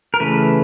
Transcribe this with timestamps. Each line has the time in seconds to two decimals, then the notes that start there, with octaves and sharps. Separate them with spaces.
0.14 A#4
0.20 C#3 E3 A3 B4